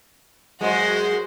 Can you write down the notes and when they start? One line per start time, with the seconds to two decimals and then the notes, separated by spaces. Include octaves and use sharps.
0.61 F#2 G#3 F#4 C5